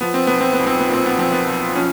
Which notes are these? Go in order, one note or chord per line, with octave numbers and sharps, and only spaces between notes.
F3 B3
C4
B1 B3
C4
B3
B1
C4
B3
A#2 C4
B3
F3 C4
B3
B1
F3 C#4